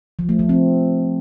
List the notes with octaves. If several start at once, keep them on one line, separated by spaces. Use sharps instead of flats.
F3
A3
F3
C4